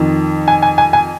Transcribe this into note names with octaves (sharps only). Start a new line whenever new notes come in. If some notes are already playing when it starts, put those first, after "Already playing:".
Already playing: F2 D#3
G#5
G#5
G#5
G#5